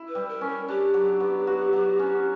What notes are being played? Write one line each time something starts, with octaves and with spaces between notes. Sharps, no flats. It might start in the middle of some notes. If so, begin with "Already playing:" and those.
Already playing: E4
B4
G3
A#4
C#4
A#4
D4 G4
F#3
B3
F#4
F#3
C#4